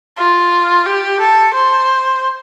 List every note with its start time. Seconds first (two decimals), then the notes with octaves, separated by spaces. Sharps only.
0.17 F4
0.86 G4
1.20 A4
1.54 C5